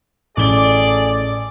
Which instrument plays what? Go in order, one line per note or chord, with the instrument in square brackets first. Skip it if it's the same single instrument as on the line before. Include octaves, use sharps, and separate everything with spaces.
[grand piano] A1 G7 [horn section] G#4 A4 D5